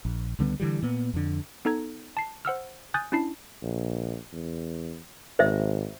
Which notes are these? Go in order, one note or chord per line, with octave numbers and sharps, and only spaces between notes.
A#1
C#2 D3 G3 B3
D3 E3 G3
A#2 B3
F2 D3
B3 D#4 A4 A#5 G#6
A5 C7
C5 F#5 E6 F6
G#5 D#6 F#6 G6 A6
C#4 D4 E4 A5 C7
A#1
E2
G#1 C5 E5